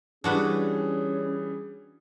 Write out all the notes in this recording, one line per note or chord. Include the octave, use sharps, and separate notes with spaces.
E3 G3 C#4 D4 F#4 G#4 B4